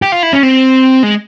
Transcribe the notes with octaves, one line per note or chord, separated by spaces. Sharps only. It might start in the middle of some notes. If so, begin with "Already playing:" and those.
G4
F4
E4
C#4
C4
G#3